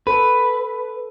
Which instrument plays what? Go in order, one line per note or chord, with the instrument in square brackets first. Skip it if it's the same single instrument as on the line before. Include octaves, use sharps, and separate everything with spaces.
[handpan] A4 [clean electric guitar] B4